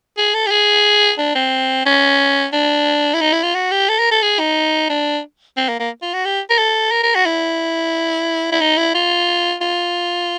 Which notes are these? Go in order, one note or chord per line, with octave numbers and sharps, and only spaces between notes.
G#4
A4
G4
G#4
D4
C4
C#4
D4
E4
D#4
E4
F4
F#4
G4
A4
A#4
A4
G#4
D#4
D4
C4
A#3
A#3
F4
F#4
G4
A#4
A4
A#4
A#4
F#4
E4
E4
D#4
E4
F4
F4